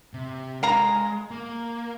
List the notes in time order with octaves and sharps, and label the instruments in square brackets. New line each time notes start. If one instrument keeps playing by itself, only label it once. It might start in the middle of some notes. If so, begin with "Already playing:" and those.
[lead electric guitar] C3
[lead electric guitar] G#3 [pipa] F5 A#5
[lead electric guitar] A#3